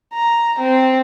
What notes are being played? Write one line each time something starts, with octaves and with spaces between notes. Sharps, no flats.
A#5
C4